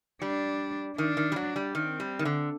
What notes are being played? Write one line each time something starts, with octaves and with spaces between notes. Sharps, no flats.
G3 D4
D#3 D4
D#3
G3
F#3
G3
D#3 C4
G3
D#3
D3